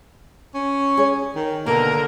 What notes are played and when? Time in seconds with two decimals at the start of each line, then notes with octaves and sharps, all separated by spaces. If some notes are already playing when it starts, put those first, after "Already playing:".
0.54 C#4
0.97 G#4 C#5
1.35 D#3
1.66 B2 D3 A#3 A#4